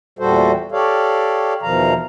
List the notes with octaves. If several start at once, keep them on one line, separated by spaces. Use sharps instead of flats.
E2 A#2 G3 F#4 A4 C5
G4 A4 C#5 D5 F5
E2 B2 D#3 F3 F5 A#5